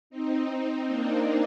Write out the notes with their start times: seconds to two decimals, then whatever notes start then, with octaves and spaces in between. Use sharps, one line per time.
0.10 C4 D#4
0.86 A#3 D4